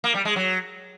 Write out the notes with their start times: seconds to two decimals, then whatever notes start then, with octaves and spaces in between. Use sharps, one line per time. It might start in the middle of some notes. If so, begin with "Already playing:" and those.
0.04 A#3
0.15 G3
0.25 G#3
0.36 F#3